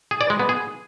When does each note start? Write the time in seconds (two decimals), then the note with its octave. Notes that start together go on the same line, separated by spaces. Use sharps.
0.11 G#4
0.21 D5
0.30 G#3
0.40 B3
0.49 G#4